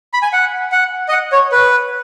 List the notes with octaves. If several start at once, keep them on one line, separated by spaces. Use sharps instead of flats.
B5
G#5
F#5
F#5
D#5
F#5
C#5
B4